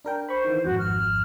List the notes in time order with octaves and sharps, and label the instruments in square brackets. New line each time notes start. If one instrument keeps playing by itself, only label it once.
[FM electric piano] D4 A#4 G5
[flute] C5 [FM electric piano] B5 C#6
[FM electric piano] D#3 E3
[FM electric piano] G#1 F2 [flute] F#4
[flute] F6